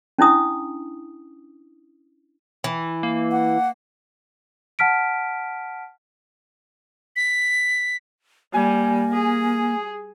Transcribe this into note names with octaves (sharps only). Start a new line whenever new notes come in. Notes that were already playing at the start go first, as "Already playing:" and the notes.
C#4 D4 E4 D#6
E3
A#3
F#5
F#5 A5 F6 B6 D7
B6
G3 A#3 G#5
G#4